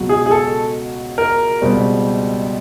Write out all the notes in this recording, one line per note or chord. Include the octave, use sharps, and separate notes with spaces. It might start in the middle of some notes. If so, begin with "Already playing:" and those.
Already playing: C#2 B2 F#3
G#4
G#4
A4
A#4
C#2 B2 G3 C4